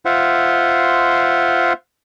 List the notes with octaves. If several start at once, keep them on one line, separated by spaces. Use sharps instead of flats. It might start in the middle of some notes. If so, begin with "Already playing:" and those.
F4 C5 E5 F#5